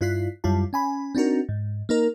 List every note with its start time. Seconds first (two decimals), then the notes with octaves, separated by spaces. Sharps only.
0.01 G2 E4 F4 F#6 B6 C7
0.44 F#2 G3 E4 F4 A5
0.73 C#4 G#5 B5
1.15 C4 D4 D#4 F#4 A#4
1.49 G#2
1.89 A#3 D#4 A#4